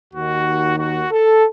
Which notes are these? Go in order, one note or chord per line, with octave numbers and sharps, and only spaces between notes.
D#2 D#3 F#4
F#4
A4